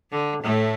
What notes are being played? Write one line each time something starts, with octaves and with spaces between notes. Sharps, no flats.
D3
A2 A3